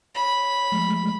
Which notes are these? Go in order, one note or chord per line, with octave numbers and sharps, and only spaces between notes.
C#5 B5
F3 G#3 A3